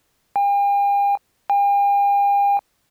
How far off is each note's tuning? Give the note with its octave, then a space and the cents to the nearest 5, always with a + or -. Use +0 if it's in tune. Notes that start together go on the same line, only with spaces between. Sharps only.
G5 +45
G5 +45